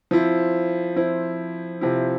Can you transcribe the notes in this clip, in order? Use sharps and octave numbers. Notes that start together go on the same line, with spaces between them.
F3 C4 E4
F3 C4 E4
C3 F3 C4 E4